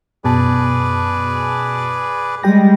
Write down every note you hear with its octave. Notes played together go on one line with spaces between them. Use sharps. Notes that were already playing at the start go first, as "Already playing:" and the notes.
F#2 B2 G#4 B4 D5 A5
G3 G#3 G4 G5 A#6